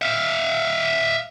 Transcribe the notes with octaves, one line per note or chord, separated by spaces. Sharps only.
E5 F5